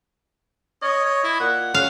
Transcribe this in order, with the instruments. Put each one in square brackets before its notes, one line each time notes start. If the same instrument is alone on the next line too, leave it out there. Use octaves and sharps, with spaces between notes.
[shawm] C#5 [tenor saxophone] D#5
[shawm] C#5
E4
[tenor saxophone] A#2 [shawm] F#5
[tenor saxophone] C#4 [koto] F5